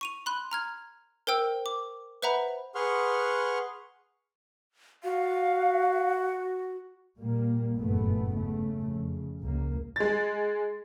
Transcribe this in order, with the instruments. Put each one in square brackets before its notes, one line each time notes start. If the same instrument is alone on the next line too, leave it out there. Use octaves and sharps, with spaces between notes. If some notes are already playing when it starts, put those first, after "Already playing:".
[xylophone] C#6 D#7 F7
B5 C6 F#6
A#5 F6 G#6
A#4 C5 G5 E6
D6
B4 C5 E5 F#5 A#5 B5
[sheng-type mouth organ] G#4 B4 F#5 C6 C#6 F6
[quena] F#4 [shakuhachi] F5
[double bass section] A#2 G3 A#3
F#1 E2 G2 A#2 A3 B3
C#3 A3
F2 C#3
C#2 A#3
[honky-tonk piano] G#3 A6